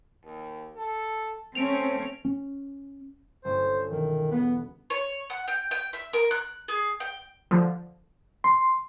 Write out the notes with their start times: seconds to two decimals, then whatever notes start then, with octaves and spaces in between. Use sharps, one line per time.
0.24 D#2
0.76 A4
1.55 A3 C4 C#4 D7 F7
2.25 C#4
3.45 G1 C#4 C5
3.91 E1 D#3
4.31 B3 B4
4.90 C#5
5.30 F#5
5.48 G5
5.71 G5
5.93 E5
6.13 A#4
6.31 F#6
6.68 G#4
7.00 G5
7.51 D3 F3
8.44 C6